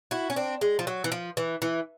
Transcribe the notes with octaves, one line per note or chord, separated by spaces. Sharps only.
E4 F#4
C#4
C4 D4
G#3
F3
F#3
E3
F3
E3
E3